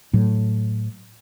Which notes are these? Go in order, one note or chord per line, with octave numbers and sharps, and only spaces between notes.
A2 F#3